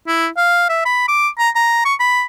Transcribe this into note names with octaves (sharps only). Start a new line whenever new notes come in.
E4
F5
E5
B5
D6
A#5
A#5
C#6
B5